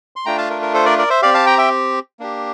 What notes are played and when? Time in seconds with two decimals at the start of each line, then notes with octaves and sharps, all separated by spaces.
0.16 C6
0.25 A3 D4 F4 G5 A#5
0.38 F5 A5
0.50 A#4
0.62 A#4
0.74 A4 C5
0.86 A#4 D5
0.98 A#4 D5
1.10 C5 E5
1.22 C4 G4 D5 F5
1.34 F5 A5
1.46 G5 A#5
1.58 E5 G5
2.19 A#3 D4 G4